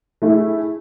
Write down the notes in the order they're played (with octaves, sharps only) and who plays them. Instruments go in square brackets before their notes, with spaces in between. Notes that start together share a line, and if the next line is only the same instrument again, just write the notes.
[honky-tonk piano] A3 E4 G#4